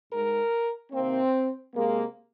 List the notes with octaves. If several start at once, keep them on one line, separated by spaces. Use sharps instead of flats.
G#2 G#3 A#4
C3 D#3 A#3 C4
C3 G#3 A#3